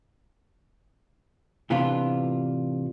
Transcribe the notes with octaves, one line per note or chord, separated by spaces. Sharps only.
A2 C3 E3 B3 D4 F4